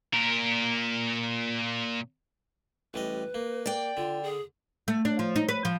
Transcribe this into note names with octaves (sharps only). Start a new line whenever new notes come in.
A#2 A#4
A1 G3 B4 D#5
A#3
D5 G5
D3 F4
G#4
A3
D4
F3
D#4
B4
F3